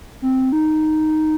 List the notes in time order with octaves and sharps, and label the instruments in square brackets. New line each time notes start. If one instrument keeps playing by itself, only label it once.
[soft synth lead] C4
D#4